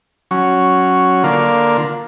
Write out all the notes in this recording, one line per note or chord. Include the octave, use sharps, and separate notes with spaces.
F#3 C#4
D3 A#3 F4